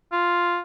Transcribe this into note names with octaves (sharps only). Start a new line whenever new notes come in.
F4